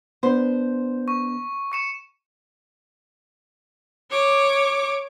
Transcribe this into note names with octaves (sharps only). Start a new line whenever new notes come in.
B3 D4 C5
C#6
C#6 C#7 E7
C#5 D6